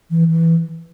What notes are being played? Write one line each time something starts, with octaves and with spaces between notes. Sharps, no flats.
E3
E3